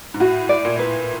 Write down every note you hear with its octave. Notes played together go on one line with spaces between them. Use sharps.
G#2
A2 F#4
D5
A#2
B4